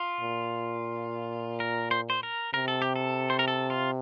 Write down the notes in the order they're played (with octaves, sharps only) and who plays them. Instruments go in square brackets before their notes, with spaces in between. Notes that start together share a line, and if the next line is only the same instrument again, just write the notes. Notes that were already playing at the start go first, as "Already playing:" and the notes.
Already playing: [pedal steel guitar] F4
[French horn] A#2
[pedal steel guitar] A#4
C5
C5
A#4
[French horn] C3 [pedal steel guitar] A#4
[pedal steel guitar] A4
G4
A4
C5
A#4
A4
F4